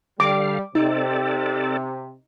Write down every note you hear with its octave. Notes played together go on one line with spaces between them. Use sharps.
D3 G3 F5 D6
C3 C4 D#4 A4 D5